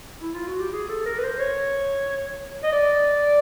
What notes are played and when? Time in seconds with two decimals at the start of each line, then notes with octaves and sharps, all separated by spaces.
0.22 E4
0.34 F4
0.47 F#4
0.60 G4
0.73 G#4
0.89 A4
1.06 A#4
1.18 B4
1.23 C5
1.39 C#5
2.63 D#5
2.72 D5